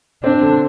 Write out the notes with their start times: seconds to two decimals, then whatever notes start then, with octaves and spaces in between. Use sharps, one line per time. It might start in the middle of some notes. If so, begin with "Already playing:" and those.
0.23 C4 D4
0.41 D3